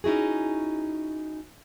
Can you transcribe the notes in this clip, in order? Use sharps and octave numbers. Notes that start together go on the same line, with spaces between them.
C#4 D#4 E4 F#4 G#4